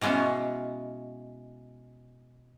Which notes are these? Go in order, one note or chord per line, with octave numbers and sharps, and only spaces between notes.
B2 E3 G#3 B3 C#4